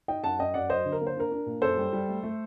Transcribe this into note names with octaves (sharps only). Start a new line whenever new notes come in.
D#4 D#5 G5
F#2 F#5 A5
F#2 D#5 G5
F#2 D5 F#5
F#3 C5 D#5
D3
A#4
A#3
C5
D4 A#4
D4
A#2
F#2 A4 C5
G3
G3
A3
A3